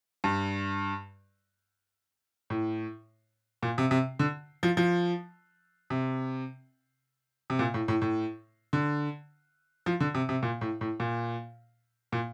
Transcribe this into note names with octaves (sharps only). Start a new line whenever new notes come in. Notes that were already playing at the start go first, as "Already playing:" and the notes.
G2
A2
A#2
C3
C3
D3
F3
F3
C3
C3
A#2
A2
A2
A2
D3
F3
D3
C3
C3
A#2
A2
A2
A#2
A#2